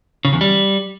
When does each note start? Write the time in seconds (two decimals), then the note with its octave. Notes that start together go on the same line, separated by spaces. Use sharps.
0.25 C#3
0.33 E2
0.41 G3